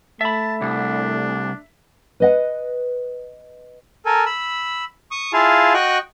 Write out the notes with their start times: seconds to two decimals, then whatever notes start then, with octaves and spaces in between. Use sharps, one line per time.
0.21 A3 E5 A5 B5
0.61 C2 D4
2.20 B4 D#5 F#5
4.06 A4 A#4 G#5
4.26 B5 E6
5.11 C#6 D#6
5.33 E4 F4 G#4 F5 G#5 A5
5.74 F#4 D#5 G5 C#6 F#6